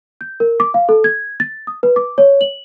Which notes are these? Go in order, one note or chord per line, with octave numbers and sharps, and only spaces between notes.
G6
A#4
D6
F5
A4
G#6
A6
D#6
B4
D6
C#5
F#7